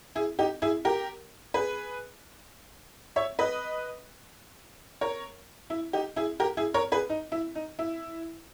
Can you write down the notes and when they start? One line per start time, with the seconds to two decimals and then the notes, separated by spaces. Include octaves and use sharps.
0.15 E4 G#4
0.39 D#4 G4
0.62 E4 G#4
0.85 G4 A#4
1.54 G#4 B4
3.16 C#5 E5
3.39 B4 D#5
5.01 A#4 C#5
5.70 E4
5.93 D#4 G4
6.16 E4 G#4
6.40 G4 A#4
6.57 E4 G#4
6.74 A#4 C#5
6.92 G#4 B4
7.10 D#4
7.32 E4
7.55 D#4
7.79 E4